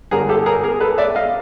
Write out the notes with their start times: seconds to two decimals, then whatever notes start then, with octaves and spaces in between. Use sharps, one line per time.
0.11 G2 D3 G3 G#4 A#4
0.29 G4 A4
0.46 G#4 A#4
0.64 G#4 A#4
0.81 A4 B4
0.98 D5 E5
1.15 D#5 F5